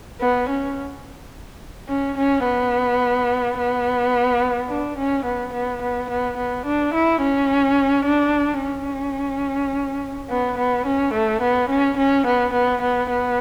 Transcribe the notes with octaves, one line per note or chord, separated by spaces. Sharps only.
B3
C#4
C#4
C#4
B3
B3
D4
C#4
B3
B3
B3
B3
B3
D4
E4
C#4
D4
C#4
B3
B3
C#4
A3
B3
C#4
C#4
B3
B3
B3
B3